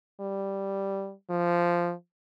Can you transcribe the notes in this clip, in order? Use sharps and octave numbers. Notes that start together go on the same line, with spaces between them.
G3
F3